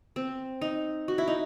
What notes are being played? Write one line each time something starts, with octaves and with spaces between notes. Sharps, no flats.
C4
D#4
F#4
E4
D#4